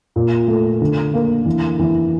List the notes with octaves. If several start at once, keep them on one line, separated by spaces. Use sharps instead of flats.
A#2
A3
D3
A#3
E3
E3